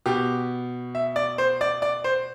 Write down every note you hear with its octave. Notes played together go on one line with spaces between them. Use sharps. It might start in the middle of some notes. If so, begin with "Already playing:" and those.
B2 G4
E5
D5
C5
D5
D5
C5